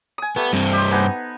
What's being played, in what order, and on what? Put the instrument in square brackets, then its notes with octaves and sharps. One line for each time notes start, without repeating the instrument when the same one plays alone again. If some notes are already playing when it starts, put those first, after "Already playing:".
[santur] G#5 D#6
[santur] G3 A3 [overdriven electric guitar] B3
[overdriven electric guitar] G2 C4
[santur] G4 C5
B3 D#4 G#5